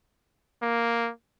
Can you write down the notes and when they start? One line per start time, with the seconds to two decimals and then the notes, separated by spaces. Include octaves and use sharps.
0.62 A#3